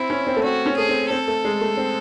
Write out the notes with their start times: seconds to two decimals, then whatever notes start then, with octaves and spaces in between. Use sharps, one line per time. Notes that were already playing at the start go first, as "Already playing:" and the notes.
Already playing: C4 E4
0.10 C#4
0.27 C4
0.36 A3
0.44 C4 F#4
0.66 C#4
0.77 A3 G#4
0.89 C4
1.10 C4 A4
1.27 A3
1.44 G#3
1.61 A3
1.77 C4